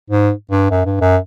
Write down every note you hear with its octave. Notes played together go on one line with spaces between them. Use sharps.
G#2
G2
F#2
G2
F#2